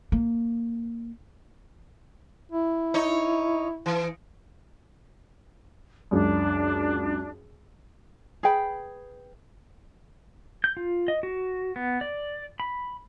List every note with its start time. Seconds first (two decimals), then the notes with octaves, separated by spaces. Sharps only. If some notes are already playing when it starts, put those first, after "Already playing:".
0.12 A#3
2.52 E4
2.94 D#4 C#5
3.86 E3
6.11 C#2 F#2 D4
8.43 G#4 B4 G5 B5
10.64 G6
10.77 F4
11.08 D#5
11.23 F#4
11.76 B3
12.01 D5
12.60 B5